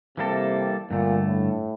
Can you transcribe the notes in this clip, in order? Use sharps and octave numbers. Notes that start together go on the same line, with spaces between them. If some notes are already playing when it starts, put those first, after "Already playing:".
C3 E3 G3 A#3 E4 A4
G2 A#2 D3 A3
A2